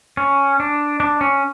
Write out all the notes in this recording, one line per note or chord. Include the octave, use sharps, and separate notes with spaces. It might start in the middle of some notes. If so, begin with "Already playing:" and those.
C#4
D4
D4
C#4